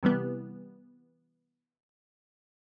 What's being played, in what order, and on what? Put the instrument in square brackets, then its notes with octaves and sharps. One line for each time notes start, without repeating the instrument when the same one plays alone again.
[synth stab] C3 E3 G3 B3